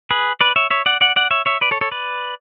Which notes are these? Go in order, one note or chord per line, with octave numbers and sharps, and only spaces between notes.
G#4 B4
B4 D5
C#5 E5
C#5 E5
D5 F#5
D5 F#5
D5 F#5
C#5 E5
C#5 E5
B4 D5
A4 C#5
A4 C#5
B4 D5